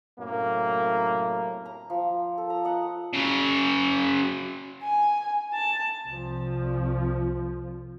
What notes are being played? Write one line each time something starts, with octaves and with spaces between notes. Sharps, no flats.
F#2 A2 C3 A#3
A#5
F3
A4
A#5
D#5 F#5
C#3 F#3
G#5
A5
C2 F3